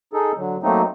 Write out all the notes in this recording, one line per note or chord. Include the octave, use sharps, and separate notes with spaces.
D#4 G#4 A4
D3 F#3
F#3 A3 A#3 C4 D#4